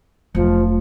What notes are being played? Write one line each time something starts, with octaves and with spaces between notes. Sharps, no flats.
F1 F3 F#3 A3